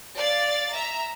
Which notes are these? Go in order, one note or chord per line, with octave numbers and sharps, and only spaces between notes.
D5 F5 A6
E5 A#5